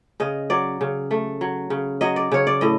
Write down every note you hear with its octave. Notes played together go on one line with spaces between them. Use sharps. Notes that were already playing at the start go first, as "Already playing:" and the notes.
C#3 D#5
F#3 D5
C#3
A3
F#3
C#3
F#3 D#5
D5
C#3 C#5
D5
A2 D#5